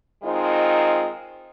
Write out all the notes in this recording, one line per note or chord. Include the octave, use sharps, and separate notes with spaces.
D#3 G#3 C4 D#4 F4